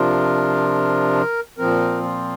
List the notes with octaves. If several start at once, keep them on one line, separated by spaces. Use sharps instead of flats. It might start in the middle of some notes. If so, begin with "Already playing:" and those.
Already playing: C3 F3 D4 F4 A#4
A#2 F3 C4 A#4
F4